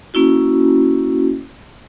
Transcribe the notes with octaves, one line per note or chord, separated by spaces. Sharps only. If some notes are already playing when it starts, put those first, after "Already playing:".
A#3 C#4 E4 F#4